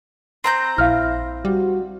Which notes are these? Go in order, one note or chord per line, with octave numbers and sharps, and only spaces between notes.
C4 A#5 G6 C7
A#1 E4 F5 F6
G3 F#4